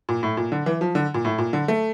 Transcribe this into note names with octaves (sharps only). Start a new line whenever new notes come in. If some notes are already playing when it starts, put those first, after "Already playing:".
A#2
A2
A#2
D3
E3
F3
D3
A#2
A2
A#2
D3
A3